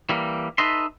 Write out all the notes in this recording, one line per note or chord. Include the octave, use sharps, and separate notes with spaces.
E3 G3 A#3
D#4 A4 B4 D#5 E5 C6